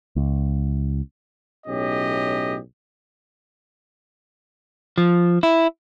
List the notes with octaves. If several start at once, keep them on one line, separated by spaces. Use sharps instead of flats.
C#2
B1 A2 C#4 G4 D#5
F3
E4